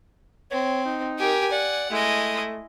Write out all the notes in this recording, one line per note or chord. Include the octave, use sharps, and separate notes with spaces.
C4 C#5
D#4
G4 A#4 G#5
D5 F#5
G#3 A3 E4 D#5